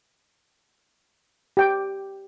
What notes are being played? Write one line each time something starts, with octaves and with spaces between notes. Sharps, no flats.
G4 G5 D6